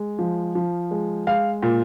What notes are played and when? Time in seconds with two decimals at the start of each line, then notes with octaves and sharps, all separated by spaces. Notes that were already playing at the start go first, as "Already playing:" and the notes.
Already playing: G#3
0.19 F3
0.55 F3
0.91 G#3
1.27 G#3 F5
1.63 A#2